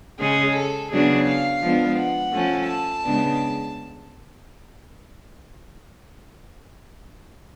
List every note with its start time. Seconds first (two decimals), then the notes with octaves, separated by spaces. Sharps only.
0.20 C#3 G#3 C#4 G#4
0.55 A4
0.91 C#3 F#3 B3 D4 G#4
1.28 F5
1.62 F3 G#3 B3 D4
1.99 F#5
2.34 F3 A3 C#4
2.69 A5
3.05 C#3 G#3 B3 D4